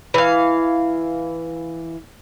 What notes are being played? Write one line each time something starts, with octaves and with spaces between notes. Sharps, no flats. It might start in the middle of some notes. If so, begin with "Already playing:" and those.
E3 F5